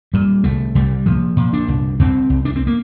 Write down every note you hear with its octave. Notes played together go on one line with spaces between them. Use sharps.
A#2 G3
C2 A3
C2 G3
A#2 F3
A#2
D4
C2
C2 C4
C2
D4
C4
A#3